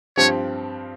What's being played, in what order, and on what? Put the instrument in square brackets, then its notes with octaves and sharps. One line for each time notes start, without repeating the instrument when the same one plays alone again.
[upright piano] G2 F3 C4 G4 [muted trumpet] C#5